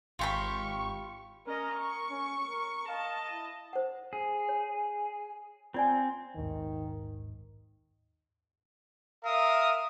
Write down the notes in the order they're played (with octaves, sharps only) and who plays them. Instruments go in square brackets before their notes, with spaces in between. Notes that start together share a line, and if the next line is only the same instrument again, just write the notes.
[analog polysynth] G#1 C#6 [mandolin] F4 G4 B5
[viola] C#4 D#5 [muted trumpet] A#4
[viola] C#6
[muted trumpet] C#4
A#4
[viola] D#5 A5 [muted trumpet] F5
[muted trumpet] E4
[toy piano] C5 F#5
[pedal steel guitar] G#4
[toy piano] C#5
[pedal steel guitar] C4 [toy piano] F4 D5 G#5
[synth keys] A#1 D#2 G#2 [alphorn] D#3
[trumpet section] A#4 E5 F5 D#6